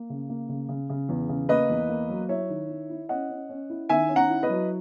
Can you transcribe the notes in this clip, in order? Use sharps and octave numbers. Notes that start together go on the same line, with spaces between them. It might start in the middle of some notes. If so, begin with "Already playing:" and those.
Already playing: A#3
C#3
A#3
C#3
C#3
C#3
E2
C#3
A#3 B4 D#5
E2
A#3
F#3
E4 C#5 E5
D#3
E4
E4
C#4 D#5 F#5
C#4
C#4
E4
D#3 E5 G#5
C#4
F#5 A#5
E4
B4 D#5
F#3